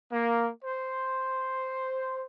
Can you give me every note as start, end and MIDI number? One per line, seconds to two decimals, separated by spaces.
0.13 0.50 58
0.65 2.25 72